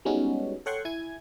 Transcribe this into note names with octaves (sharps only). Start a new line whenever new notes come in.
G3 G#3 B3 C#4 D#4 F#4
A4 C#5 F#5 G5 C6 C#6
E4 G#5 G#6